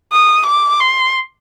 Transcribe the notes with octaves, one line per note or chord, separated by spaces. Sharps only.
D#6
D6
C6